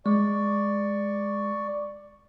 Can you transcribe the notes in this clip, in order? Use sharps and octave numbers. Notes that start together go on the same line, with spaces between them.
G#3 D5 C#6